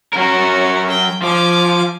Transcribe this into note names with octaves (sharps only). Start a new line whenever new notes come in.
F#3 C#4 F#4 A#4
G5
F3 G#5 D6